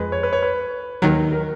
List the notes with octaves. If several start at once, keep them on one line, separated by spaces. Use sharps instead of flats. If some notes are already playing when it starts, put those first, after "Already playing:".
Already playing: F2 G#3 B4
C#5
B4
C#5
B4
D#2 D#3 F#3 A#4
A#4